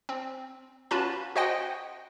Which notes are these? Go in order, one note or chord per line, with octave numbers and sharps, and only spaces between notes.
C4
C#4 F4 F#4 B4 A5 B5
F#4 C5 D#5 F#5 G5